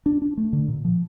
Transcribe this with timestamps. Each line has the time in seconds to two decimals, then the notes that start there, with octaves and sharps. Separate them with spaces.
0.06 D4
0.22 D4
0.37 A3
0.53 D3
0.68 A#2
0.85 F3